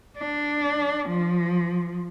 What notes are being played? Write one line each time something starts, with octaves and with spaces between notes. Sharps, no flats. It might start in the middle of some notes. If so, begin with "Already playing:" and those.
D4
F3